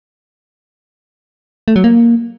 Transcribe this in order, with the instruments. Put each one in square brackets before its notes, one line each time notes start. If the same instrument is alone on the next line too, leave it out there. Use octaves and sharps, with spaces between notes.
[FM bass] A3
F#3
A#3